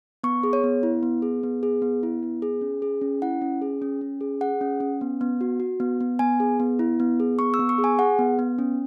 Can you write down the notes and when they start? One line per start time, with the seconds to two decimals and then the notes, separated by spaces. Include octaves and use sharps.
0.24 B3 C#6
0.43 G#4
0.53 C#5
0.64 B3
0.83 E4
1.03 B3
1.22 G#4
1.43 B3
1.63 G#4
1.82 B3
2.03 E4
2.23 B3
2.42 G#4
2.61 C#4
2.82 G#4
3.01 C#4
3.22 E4 F#5
3.42 C#4
3.62 G#4
3.82 C#4
4.01 C#4
4.21 G#4
4.41 G#4 F#5
4.61 C#4
4.80 C#4
5.01 B3
5.21 B3
5.41 F#4
5.60 F#4
5.80 B3
6.01 B3
6.19 B3 G#5
6.40 G#4
6.60 B3
6.79 E4
7.00 B3
7.20 G#4
7.39 B3 C#6
7.54 E6
7.59 B3
7.69 C#6
7.78 G#4
7.84 G#5
7.99 G#4 F#5
8.19 B3
8.39 B3
8.58 C#4